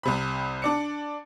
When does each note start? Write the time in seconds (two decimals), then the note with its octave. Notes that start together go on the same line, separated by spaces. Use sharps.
0.03 C2 C3 B5
0.62 D4 D5 C#7